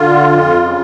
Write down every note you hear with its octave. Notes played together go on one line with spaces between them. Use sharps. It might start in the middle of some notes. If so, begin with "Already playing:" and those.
Already playing: D3 F4
F2
C#3